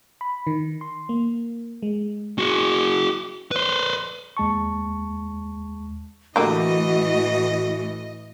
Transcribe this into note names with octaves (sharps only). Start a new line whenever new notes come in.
B5
D#3
C6
A#3
G#3
F#4 G#4
B4 C5
D#2 G#3 A5 C#6
A2 D3 E3 A3 A#3 F#4 G4 D#5